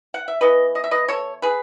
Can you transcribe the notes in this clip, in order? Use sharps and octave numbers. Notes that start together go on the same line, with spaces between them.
F#5
E5
E3 B3 B4 D#5
D#5
E5
B4 D#5
A4 C#5
G#4 B4